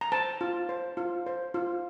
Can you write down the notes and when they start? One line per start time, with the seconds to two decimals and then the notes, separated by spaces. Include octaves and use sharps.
0.01 A#5
0.12 C5 A5
0.41 F4
0.69 C5
0.97 F4
1.26 C5
1.54 F4